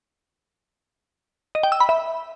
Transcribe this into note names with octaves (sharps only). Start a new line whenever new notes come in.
D#5
G5
E6
B5
E5